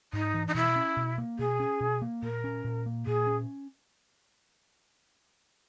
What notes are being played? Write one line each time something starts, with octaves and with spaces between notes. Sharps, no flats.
G#2 D#4
E3
D#4
B2 E4
C#4
B2
A#3
B2 G#4
C#4
B2
A#3
A#2 A#4
C#4
A#2
A#3
A#2 G#4
C#4